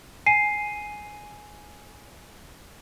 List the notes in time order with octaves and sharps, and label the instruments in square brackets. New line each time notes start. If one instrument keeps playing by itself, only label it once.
[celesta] G#5 C7 D#7